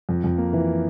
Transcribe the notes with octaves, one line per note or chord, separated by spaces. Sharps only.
F2
F2
A#3
E3